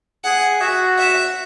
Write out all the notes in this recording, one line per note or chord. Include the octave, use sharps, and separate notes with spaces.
G#4 F#5
F#4 E5
E5